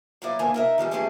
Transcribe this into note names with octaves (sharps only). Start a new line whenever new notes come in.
F#3 A#3 D#4 E4 D5
D2 D#3 A3 A#3 G#5 A#5
D#4 A#4 E5
D#3 F3 G3 G#3
G3 A3 B3 C#4 G4 G#4